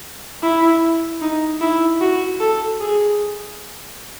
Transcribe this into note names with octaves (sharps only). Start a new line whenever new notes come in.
E4
D#4
E4
F#4
A4
G#4